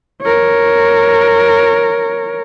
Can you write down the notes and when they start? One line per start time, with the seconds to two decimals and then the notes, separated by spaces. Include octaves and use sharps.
0.22 A#4 C#5